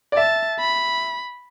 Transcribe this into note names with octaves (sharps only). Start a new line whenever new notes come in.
D5
E5 A5
B5